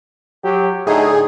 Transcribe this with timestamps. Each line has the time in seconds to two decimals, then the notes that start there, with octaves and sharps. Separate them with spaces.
0.44 F#3 G4
0.87 A2 D3 D#4 G#4